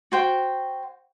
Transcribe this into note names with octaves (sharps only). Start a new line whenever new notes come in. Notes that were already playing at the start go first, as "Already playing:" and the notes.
F#4 C5 G5